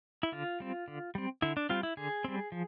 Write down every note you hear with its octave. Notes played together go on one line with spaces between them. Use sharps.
E4
D3 F4
G3 C4
D3
G3 C4
D3 E4
D4
G3 C4 F4
E4
D3 G#4
G3 C4
F3